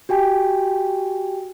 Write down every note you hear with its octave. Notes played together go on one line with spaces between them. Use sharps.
F#4 G4 G5 G#5